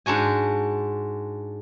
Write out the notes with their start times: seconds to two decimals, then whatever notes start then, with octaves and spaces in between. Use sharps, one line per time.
0.06 G#2 D4 F#4 G#5